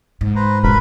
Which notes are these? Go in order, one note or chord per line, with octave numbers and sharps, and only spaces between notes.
G#2
B4 C5 A#5
E1 A#4 B4 B5